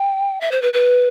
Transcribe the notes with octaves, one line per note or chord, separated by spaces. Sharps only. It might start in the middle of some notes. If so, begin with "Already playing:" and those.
Already playing: G5
E5
C5
B4
B4